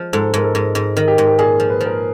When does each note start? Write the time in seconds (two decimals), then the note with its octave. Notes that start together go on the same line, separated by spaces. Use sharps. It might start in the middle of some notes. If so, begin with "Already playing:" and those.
Already playing: F3 G#3
0.13 G#2 A4
0.34 G#2 A#4
0.44 A4
0.55 G#2
0.75 G#2
0.97 D#3
1.08 G4
1.18 G#2
1.27 G4
1.39 A#2 G#4
1.60 F3
1.70 B4
1.81 F3
1.86 A#4